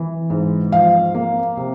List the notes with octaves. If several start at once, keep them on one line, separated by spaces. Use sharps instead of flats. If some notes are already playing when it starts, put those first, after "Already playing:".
Already playing: E3
G#2
F3 F5
A#3
C3